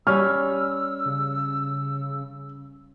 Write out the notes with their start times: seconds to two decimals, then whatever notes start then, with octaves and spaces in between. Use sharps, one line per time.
0.07 G3 C#4 E6 F6
1.06 C#3